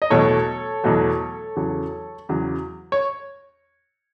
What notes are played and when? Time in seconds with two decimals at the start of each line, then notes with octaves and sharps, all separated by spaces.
0.02 D#5
0.10 E2 B2 F#3 A3 A4 C#5
0.84 E2 B2 F#3 A3
1.56 E2 C#3 F#3
2.29 E2 C#3 F#3
2.92 C#5